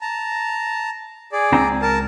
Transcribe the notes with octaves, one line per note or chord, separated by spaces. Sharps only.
A5 A#5
G#4 D5
C#2 C4 A#5
A#4 A5